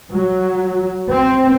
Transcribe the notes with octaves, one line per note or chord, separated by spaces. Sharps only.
F#3
C4